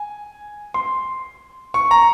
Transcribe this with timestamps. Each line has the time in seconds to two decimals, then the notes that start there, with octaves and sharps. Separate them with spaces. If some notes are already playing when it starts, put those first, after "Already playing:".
Already playing: G#5
0.74 C6
1.74 C#6
1.91 A#5